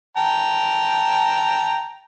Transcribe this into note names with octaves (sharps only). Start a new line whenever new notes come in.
G5 A5 A#5